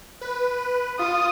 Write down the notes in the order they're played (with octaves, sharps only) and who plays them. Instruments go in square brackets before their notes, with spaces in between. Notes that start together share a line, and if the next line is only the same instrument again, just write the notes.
[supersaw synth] B4
[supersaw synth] F4 [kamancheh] D#6